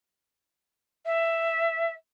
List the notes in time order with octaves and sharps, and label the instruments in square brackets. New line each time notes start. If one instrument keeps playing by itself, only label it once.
[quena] E5